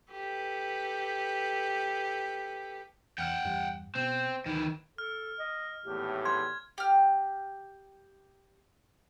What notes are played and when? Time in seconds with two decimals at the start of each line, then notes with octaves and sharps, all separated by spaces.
0.11 G4 A4 B4
3.18 E2 F#5 G5 F6
3.45 E2 G2 G3
3.95 B2 C4
4.46 D2 D#3 E3
4.98 A4 F6
5.39 D#5
5.86 G#1 E2 A2 G4
6.25 C6 G#6
6.78 G4 F6